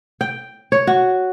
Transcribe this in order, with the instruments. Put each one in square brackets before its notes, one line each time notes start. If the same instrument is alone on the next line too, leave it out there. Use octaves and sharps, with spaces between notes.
[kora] G5
C#5
F#4